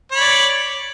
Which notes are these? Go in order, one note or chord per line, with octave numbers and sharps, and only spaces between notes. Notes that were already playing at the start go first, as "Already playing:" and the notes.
C#5 D5 B5